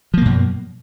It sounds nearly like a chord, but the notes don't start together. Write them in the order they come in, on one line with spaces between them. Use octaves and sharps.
F3 A#3 B2 F#2